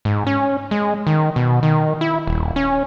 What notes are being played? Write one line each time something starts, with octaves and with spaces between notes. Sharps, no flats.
G#2
C#4
G#3
D#3
B2
D#3
E4
D#1
C#4